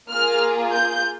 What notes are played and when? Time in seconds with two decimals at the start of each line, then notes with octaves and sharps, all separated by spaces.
0.10 A#3 F4 G#4 F6
0.72 G6